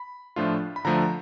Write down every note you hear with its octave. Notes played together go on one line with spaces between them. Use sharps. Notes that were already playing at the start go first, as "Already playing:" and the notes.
Already playing: B5
A2 F3 A3 D4 F4
B5
D3 F3 A3 A#5